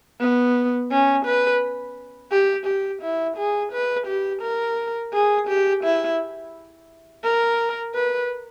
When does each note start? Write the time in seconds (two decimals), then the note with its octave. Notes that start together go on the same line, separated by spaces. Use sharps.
0.20 B3
0.91 C#4
1.26 B4
2.31 G4
2.66 G4
3.02 E4
3.37 G#4
3.72 B4
4.07 G4
4.42 A#4
5.13 G#4
5.48 G4
5.84 E4
7.24 A#4
7.95 B4